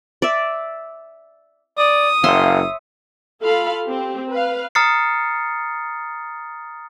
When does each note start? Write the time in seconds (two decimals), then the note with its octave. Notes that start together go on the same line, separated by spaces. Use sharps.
0.22 D5 E5
1.78 D5 D#6
2.24 F#1 C#5 E5 F5 C6
3.41 F4 A4 F5 B5
3.87 C4 G4
4.31 B4 F5
4.75 A#5 D#6 F6 A6 C7 C#7